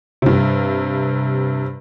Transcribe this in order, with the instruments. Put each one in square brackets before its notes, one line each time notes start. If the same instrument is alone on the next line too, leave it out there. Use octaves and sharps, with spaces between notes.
[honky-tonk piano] G2 C3